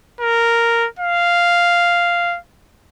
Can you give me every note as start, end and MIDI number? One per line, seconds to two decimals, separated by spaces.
0.20 0.87 70
0.99 2.38 77